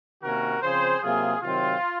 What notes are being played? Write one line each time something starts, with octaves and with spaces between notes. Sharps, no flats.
C3 D#3 A#3 C#4 F#4 A#4
C#3 F3 C4 G#4 C5
C3 F#3 A#3 F4 G#4
C3 D#3 F#3 C4 F4